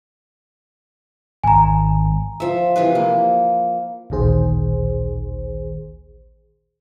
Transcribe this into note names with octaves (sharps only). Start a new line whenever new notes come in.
G#1 G#5 A#5
F3 E5
C3 E3 F3 B4
A#3
A1 D2 A#2 D#3 G#4 C5